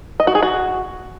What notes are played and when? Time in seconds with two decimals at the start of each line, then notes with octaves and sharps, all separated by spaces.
0.20 D#5
0.27 F#4
0.35 G#4
0.43 F#4